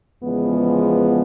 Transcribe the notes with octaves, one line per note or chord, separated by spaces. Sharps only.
E2 C#3 F3 G#3 B3